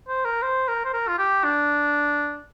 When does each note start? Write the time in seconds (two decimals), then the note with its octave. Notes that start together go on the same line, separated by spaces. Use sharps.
0.08 C5
0.25 A#4
0.42 C5
0.68 A#4
0.85 C5
0.94 A#4
1.08 F4
1.18 G4
1.44 D4